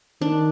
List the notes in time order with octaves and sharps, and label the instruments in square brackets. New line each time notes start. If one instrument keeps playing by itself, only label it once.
[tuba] D#3 [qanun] D4